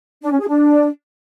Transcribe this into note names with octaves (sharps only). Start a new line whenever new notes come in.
D4
C#4
G#4
D4